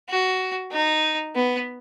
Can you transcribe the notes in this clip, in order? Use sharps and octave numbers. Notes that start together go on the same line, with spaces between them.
F#4
D#4
B3